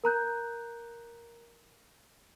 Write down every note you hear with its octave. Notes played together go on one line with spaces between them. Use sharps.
A#4 A#5 F#6 G6